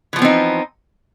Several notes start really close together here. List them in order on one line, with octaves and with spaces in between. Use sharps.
E3 F3 B3 C4 D#4